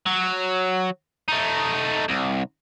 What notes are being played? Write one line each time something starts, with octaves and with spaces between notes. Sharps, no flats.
F#3
A3 D#4
C2